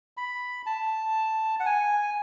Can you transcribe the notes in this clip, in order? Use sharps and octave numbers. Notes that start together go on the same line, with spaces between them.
B5
A5
F#5
G#5